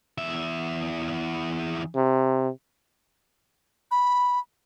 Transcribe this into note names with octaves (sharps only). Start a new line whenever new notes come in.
E2 E5
C3
B5